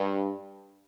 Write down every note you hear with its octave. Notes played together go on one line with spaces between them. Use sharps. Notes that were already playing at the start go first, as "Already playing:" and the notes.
Already playing: G2